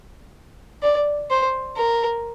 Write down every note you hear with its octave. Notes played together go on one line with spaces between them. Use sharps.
D5
C5
A#4